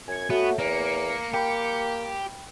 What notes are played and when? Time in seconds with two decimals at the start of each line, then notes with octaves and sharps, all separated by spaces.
0.08 F#2 G#5 G#6 C#7
0.30 A3 B3 F#4 C#5
0.59 E2 A#3 C#7
1.34 A#3 G4 G5 B5